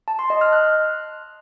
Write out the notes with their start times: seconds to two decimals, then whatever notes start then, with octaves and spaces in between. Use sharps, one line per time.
0.08 A5
0.19 C6
0.30 D#5
0.41 F6
0.53 F#6